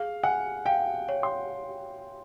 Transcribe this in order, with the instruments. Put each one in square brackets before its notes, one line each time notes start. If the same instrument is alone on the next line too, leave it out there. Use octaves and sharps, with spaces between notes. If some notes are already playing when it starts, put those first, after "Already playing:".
Already playing: [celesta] G#4 [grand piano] F5
[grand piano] F#5 [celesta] G#5
[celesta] F5 [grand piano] G5
[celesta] C#5
[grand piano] C6